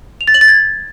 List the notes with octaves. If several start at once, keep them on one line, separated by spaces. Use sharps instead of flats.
F7
A6
F#7
A6
G#6